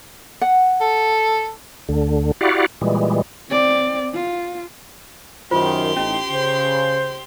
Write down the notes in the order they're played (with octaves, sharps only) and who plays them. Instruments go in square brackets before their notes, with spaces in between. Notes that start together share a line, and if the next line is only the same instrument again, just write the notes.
[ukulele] F#5
[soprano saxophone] A4
[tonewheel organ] D2 D3
E4 F#4 G4 D5 F5 F#5
A#2 E3 G3 G#3
[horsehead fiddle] C4 D5
F4
[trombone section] F#2 D#3 [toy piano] F4 C5 [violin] G4 C6
[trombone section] A1 D#4 [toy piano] C#4
[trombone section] C#3 [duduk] C5